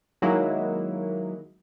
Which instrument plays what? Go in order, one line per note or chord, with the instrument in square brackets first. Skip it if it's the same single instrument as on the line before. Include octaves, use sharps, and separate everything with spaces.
[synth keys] D#3 F#3 G#3 A#3 E4